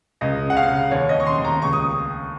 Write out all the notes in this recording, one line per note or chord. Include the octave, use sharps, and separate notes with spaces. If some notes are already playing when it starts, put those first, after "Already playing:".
C#2 D#5
C#3
F#5
F5
C#3
D#2 C#5
D#5
D#2
C#6
C6
D#2
A#5
C#2 C#6
D#6